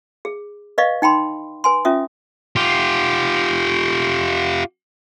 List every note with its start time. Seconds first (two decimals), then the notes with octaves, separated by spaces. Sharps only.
0.25 G#4
0.78 B4 D5 D#5 F5 C#6
1.02 D#4 G5 B5 C6
1.64 B4 G#5 C6
1.85 C#4 F4 E5 D#6
2.56 F4 G4